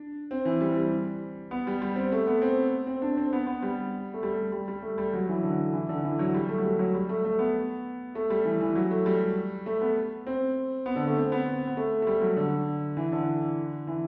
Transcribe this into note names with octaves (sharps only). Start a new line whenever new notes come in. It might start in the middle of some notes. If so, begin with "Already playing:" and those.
Already playing: D4
C4
E3
G3
G3
B3
G3
G3
C4
A3
B3
C4
C4
D4
C4
B3
B3
G3
A3
G3
G3
G3
A3
G3
F#3
E3
D3
E3
D3
E3
F#3
G3
A3
F#3
G3
F#3
G3
A3
A3
B3
A3
G3
E3
E3
F#3
A3
G3
A3
B3
C4
B3
D3
A3
C4
B3
B3
A3
A3
G3
F#3
D3
E3
D3
E3